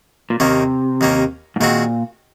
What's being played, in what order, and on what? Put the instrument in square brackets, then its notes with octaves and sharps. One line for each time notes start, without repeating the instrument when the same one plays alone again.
[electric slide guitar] A#2
[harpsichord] D#2 D#3 A#3 C#4 [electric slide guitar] C3
[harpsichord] D#2 D#3 A#3 C#4
[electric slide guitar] G#2
[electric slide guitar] A#2 [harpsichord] D#3 G#3 C4 F#4